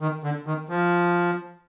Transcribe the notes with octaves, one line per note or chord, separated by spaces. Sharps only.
D#3
D3
D#3
F3